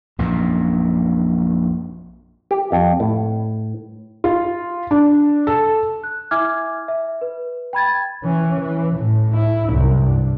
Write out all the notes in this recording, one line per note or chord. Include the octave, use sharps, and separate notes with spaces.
A#1 F#2 B2
G4
F2
A2
F4
D4
A4
F#6
E4 E5 G#5 D6 F6 G#6
E5
B4
G5 B5 G#6 A6
E3 C#4
E3
A2
E4
C2 F#2
G2